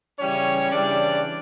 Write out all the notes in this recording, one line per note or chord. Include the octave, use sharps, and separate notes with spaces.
C#3 E3 G3 C#4 C#5
C#3 E3 G3 D4 D5